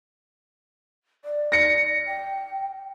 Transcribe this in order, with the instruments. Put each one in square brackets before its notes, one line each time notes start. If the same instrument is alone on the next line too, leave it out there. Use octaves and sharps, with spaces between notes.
[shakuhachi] D5
[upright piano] A#6 C#7
[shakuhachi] G5